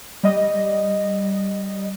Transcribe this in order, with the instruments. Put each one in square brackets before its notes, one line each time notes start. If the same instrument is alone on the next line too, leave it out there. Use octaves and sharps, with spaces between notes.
[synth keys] G3 D#5